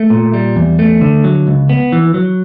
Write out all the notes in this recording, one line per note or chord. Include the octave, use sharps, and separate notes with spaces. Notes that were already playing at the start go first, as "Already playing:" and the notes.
Already playing: A3
A#2
G3
E2
A3
D3
F#3
C#2
B3
E3
F#3